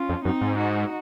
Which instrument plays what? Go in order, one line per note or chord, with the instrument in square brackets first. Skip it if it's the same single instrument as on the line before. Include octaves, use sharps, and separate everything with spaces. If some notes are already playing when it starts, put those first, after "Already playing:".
Already playing: [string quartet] C#4 F4
[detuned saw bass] F2
[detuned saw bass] F#2 [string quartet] C4 D#4
[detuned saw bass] G#2
[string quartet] D#4 F#4